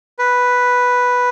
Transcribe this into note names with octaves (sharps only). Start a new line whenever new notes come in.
B4